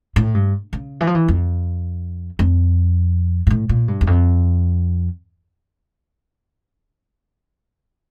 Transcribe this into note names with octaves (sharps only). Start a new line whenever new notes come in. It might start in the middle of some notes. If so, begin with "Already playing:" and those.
A2
G2
C#3
E3
F3
E3
F2
F2
A#2
A2
A#2
G2
E2
F2